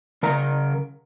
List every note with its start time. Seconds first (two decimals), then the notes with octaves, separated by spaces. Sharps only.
0.23 C#3 A#4 A#5